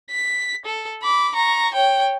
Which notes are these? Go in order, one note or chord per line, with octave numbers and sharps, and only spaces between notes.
B6
A4
B5 D6
A#5 C#6
C#5 G5